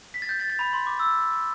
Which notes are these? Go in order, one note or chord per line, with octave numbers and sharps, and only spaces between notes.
B6
A6
G6
A6
A6
B5
C6
D6
E6